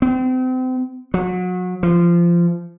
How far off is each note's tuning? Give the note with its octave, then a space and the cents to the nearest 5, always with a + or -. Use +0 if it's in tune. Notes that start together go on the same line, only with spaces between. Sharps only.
C4 -35
F#3 -30
F3 -20